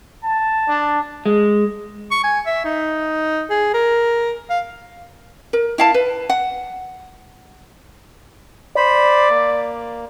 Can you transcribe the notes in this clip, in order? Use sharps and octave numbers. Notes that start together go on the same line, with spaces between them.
A5
D4
G#3
C#6
G#5
E5
D#4
G#4
A#4
F5
A#4
E4 F5 A5
B4
F#5
C5 D5 B5
A#3